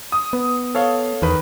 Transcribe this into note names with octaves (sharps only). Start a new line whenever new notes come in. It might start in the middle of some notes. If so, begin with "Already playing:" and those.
D#6
B3
A4 C#5 F5
E2 D#3 B4